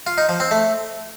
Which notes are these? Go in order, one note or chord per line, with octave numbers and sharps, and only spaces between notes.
F4
D#4
F3
C4
A3